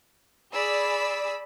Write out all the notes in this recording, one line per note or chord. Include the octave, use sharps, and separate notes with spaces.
G#4 D5 B5 E6